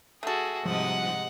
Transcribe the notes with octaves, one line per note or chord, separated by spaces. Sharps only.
A3 F#4 G#4 A4
G#2 C3 F3 G3 D#4 F#5